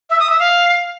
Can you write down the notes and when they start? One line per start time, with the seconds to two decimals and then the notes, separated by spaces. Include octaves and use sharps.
0.10 E5
0.20 D#6
0.30 E5
0.40 F5